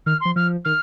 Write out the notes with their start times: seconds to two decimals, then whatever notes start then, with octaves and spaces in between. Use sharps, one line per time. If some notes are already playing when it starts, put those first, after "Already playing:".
0.06 D#3 F6
0.21 F3 C6
0.36 F3 F6
0.65 D#3 F6